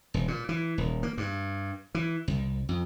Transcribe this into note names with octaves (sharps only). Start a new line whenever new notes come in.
E1
A#2
E3
D#1
A#3
G2
E3
C2
F2